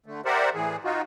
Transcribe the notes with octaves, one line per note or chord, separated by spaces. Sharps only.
D3 A3
G4 A#4 C5 D5 E5 F#5
A2 E3 G#4
D#4 F4 F#4